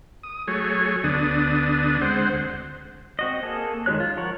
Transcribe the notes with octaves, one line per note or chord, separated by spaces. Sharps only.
D#6
F#3 A3 G#4 C#5
D2 D3 B3 D4 D#6
G#3 C4 C5 F#5
D2
C4 F#4 D#5
A#3 G#4 A4
D#3 G#3 G4 C#5 F#6
F4
F3 A#4 C#5 F#5